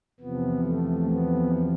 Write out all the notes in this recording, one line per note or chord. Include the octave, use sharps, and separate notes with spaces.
E2 C3 F3 B3
A3
B3